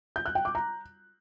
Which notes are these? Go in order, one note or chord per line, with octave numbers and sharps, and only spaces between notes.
G6
F#6
G5
D6
A#5